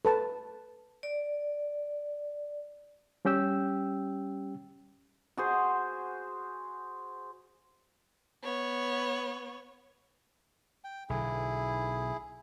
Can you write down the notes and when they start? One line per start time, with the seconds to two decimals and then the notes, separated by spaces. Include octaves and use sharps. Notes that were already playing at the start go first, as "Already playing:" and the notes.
0.05 A4 B4 A5
1.03 D5
3.25 G3 C#4 G4 G5 E6
5.37 F#4 G#4 C5
8.44 B3 C#5
10.84 G5
11.09 B1 D3 E4 G#4